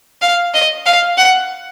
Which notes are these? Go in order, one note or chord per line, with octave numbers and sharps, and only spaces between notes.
F5
D#5
F5
F#5